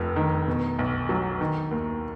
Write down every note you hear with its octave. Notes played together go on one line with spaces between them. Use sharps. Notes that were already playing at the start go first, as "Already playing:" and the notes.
Already playing: F1 F2
D#3
B2
B1
F#3
D#3
D#2